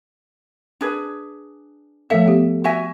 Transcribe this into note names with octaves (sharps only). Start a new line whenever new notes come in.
D4 G#4 B4
F3 A3 A4 E5 F5
B3 G4
F#4 E5 G#5